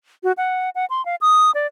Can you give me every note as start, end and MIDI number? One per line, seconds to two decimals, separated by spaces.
0.24 0.32 66
0.37 0.70 78
0.75 0.85 78
0.90 1.04 84
1.06 1.16 77
1.21 1.51 87
1.55 1.67 74